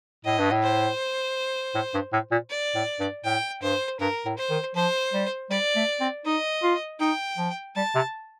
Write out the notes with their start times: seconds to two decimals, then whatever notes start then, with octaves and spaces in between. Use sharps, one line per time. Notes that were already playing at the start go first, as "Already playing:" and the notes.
0.25 A2 D#5
0.39 G2
0.51 A2
0.63 C5
1.75 A2
1.94 G2
2.13 A2
2.32 A#2
2.50 D5
2.75 A2
3.00 G2
3.25 A2 G5
3.63 G2 C5
4.00 G2 A#4
4.26 A2
4.38 C5
4.50 D#3
4.76 F3 C5
5.13 G3
5.50 G3 D5
5.76 A3
6.01 C4
6.26 D#4 D#5
6.63 F4
7.00 D#4 G5
7.38 F3
7.76 G3 A5
7.95 C3